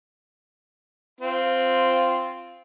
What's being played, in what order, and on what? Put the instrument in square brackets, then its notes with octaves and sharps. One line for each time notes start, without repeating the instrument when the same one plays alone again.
[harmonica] C4 F4